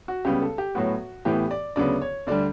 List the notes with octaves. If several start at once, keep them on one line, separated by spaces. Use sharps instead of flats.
F#4
C#2 C#3 G3 B3 G4
A4
G4
A2 F#3 B3 F#4
A2 E3 B3 G4
D5
D2 C#3 F#3 B3 D5
C#5
D2 D3 G3 D5